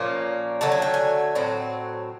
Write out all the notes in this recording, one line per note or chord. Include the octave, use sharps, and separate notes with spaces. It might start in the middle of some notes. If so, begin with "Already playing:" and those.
Already playing: A#2 F3 A#3 C#4
D3 F#3 A3 A5
G#5
G5
G#5
A2 F#3 C4